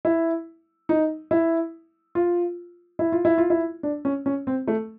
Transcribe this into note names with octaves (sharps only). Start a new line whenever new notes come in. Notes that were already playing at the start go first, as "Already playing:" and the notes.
E4
D#4
E4
F4
E4
F4
E4
F4
E4
D4
C#4
C#4
C4
A3